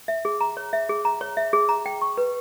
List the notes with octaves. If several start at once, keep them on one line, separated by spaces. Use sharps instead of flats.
E5
G#4
A#5
C#5
E5
G#4
A#5
C#5
E5
G#4
A#5
G5
C#6
B4